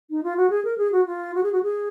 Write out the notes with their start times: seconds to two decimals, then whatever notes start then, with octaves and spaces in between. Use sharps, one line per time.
0.10 D#4
0.23 F4
0.37 F#4
0.50 G#4
0.65 A#4
0.78 G#4
0.92 F#4
1.06 F4
1.35 F#4
1.43 G#4
1.52 F#4
1.63 G#4